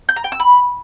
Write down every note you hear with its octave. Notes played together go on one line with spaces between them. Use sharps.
G6
A#5
G5
E6
B5